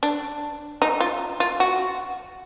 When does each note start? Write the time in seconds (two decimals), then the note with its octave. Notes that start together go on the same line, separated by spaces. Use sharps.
0.03 D4
0.82 D#4
1.00 F4
1.40 F4
1.60 F#4